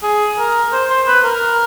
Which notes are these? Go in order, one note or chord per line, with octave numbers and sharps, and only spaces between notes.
G#4
A#4
C5
C5
B4
A#4